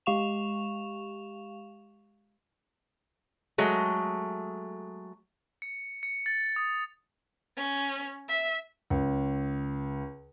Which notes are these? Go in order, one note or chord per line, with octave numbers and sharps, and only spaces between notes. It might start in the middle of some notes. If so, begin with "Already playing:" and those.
G#3 G4 F5 C#6 E7 F7
F#3 G#3 A3
C#7
C#7
A6
D#6
C#4
E5
C#2